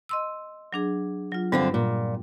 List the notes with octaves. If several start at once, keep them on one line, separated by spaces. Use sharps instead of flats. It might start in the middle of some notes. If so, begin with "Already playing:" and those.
D#5 C6 E6
F#3 D4 G#4
F#3 F4
G2 D3 G3 C4 F4
A#2